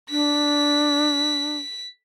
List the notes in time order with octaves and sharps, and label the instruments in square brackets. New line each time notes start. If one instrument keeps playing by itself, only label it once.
[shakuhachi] D4 [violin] B6